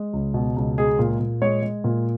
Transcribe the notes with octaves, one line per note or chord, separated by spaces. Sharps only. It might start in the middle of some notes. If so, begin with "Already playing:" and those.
Already playing: G#3
C#2
B2
C#2
G#3 G#4
A#2
A#2
G#3 C#5
G#3
A#2